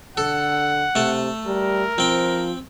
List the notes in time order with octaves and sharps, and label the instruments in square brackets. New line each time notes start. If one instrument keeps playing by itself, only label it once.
[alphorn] D3 [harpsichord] A4 [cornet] F#5
[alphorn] C3 [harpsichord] A3 A5
[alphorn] G3 [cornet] A#4
[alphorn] F3 [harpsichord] C4 G5